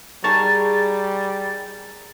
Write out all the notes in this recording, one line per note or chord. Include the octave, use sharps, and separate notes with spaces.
G3 D#4 G#4 A#4 A5 C#6 A6